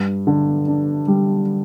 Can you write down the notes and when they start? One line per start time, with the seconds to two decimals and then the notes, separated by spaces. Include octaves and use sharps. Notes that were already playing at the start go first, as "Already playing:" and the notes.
Already playing: G2
0.27 D3
0.68 D4
1.08 G3